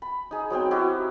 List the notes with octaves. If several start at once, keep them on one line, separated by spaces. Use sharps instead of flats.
B5
D#4 G#4
F#3 B3 C4 G5
D#4 E4 F#4 G4